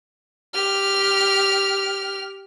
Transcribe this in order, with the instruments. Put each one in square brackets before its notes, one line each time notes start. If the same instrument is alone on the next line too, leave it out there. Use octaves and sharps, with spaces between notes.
[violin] G4 F6